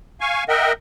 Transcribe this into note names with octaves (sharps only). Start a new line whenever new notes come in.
F5 G#5 C#6
A#4 D#5 E5 F#5 G5